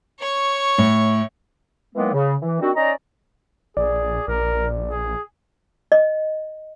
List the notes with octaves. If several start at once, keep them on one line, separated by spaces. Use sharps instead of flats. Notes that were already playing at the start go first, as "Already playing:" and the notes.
C#5 C#6
A2
D#3 E3 F#3 G#3 A#3 B3
C#3
E3
D#3 G3 C4 D4 F#4
C#4 D#4 D5 D#5 A#5
A#1 G#4 D5
A#1 A#4
G#4
D#5